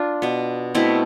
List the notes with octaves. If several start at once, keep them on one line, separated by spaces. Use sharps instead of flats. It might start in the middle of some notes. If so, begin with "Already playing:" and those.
Already playing: D4 F4
B2 B3
B2 A3 C4 E4